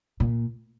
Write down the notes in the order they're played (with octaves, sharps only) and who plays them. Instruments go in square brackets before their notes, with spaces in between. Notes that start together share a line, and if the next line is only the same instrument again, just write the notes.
[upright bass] A#2